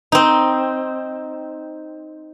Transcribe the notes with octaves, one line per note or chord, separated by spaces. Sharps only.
C4 D#4